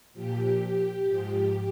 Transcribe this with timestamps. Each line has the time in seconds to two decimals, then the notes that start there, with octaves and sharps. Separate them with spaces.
0.13 A#2 F3 G4
1.05 G#2 F3